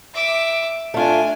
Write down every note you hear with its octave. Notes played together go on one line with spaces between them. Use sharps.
E5 D6
A3 D4 F4 G#5